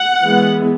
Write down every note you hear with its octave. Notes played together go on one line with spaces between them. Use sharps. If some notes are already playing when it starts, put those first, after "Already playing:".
Already playing: F#5
E3 G#3 B3